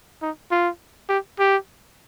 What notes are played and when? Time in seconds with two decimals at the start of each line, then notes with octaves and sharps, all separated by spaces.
0.22 D#4
0.51 F4
1.09 G4
1.39 G4